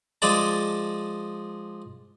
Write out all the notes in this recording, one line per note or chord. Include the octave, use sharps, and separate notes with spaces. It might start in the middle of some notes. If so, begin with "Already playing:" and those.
F3 G#3 G#4 D5 A5